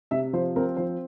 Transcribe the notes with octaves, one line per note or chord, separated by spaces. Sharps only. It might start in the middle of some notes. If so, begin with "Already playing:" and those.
C3 E5
F3 C5
C4 A#4
F3 C5